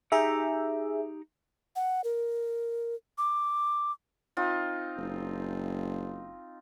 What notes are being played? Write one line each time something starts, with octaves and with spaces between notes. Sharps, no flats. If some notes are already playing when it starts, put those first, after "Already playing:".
D#4 G4 G#4 E5 A#5
F#5
A#4
D6
C4 D#4 F4
F#1